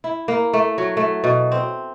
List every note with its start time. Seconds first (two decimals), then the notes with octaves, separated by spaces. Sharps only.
0.04 E4
0.28 A#3
0.53 A3
0.78 F#3
0.97 A3
1.24 B2
1.52 C4